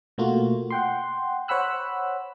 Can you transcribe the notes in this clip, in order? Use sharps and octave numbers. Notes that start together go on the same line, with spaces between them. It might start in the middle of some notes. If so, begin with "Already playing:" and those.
B2 A3 A#3 F4 F#4
F#5 G5 C6
C5 C#5 F#5 B5 E6 F#6